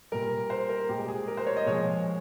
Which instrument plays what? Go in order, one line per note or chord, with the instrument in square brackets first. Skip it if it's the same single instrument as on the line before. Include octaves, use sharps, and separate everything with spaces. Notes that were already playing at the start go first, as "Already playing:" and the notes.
[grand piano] A#2 G3 A#4
C5
A#4
A#2 G#3 G4
G#4
A#4
C5
C#5
D#5
A#2 F3 G#3 C#5